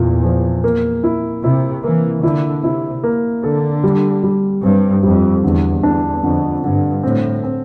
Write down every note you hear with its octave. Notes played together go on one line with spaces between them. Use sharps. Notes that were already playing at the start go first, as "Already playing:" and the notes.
Already playing: E2 A#2
F3
A#3
E4
C3 E4
E3 A#3
D3 E4
C3 E4
A#3
D3 A4
G3
G3
G2 C4
F2 G3
E2 D3
E2 D4
F2 D3
G2 D3
A2 C4
C4